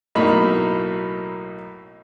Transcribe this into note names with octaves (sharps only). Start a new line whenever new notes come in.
B1 A2 A#3 D#4 D#5 B5